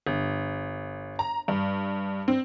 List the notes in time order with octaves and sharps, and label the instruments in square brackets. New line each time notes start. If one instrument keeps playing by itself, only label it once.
[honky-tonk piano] G1
A#5
G2
C4